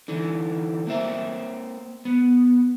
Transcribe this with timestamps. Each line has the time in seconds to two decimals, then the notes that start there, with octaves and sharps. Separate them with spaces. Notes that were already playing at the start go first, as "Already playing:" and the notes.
0.08 D3 E3
0.87 A#3 C4 E5
2.05 B3